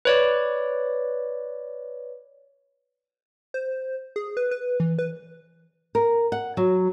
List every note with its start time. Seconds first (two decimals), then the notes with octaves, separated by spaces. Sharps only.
0.05 B4 C#5 D5
3.54 C5
4.16 G#4
4.37 B4
4.51 B4
4.80 E3
4.99 B4
5.95 A#4
6.32 F#5
6.57 F#3